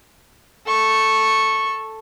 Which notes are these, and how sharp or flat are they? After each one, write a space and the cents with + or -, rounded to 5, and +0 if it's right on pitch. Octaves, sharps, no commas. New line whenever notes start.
A4 +0 C#6 -10